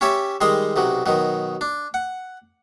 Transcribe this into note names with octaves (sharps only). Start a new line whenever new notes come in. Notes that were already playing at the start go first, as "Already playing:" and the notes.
C#4 G4 C#5 E5 A5
D#3 G3 G#3 D#5 C6
B1 C3 F#3
B2 D#3 F#3
D4
F#5